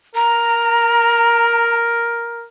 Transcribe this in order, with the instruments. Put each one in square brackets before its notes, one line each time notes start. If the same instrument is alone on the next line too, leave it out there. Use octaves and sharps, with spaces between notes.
[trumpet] A#4 [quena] A#5